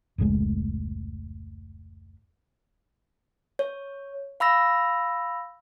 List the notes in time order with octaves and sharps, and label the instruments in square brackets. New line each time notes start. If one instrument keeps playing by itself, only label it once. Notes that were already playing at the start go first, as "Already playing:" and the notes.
[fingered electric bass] F1 C#2 A2 G#3
[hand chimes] C#5
F5 B5 E6 A#6